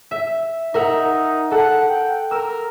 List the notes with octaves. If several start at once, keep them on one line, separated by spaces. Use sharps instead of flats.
E5
D#4 A#4 E5 F#5
A4 F#5
G5
A#4 E6